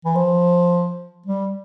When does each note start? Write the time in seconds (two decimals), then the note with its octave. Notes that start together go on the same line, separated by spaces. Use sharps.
0.05 E3
0.15 F3
1.26 G3